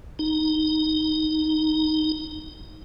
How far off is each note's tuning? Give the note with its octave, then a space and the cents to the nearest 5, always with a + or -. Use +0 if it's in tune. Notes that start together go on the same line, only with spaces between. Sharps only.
D#4 +0